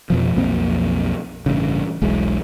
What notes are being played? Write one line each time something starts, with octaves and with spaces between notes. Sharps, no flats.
F2 B2 F3
B1 F2 A#3 C4
A1 G2 C#3
E1 B1 G#3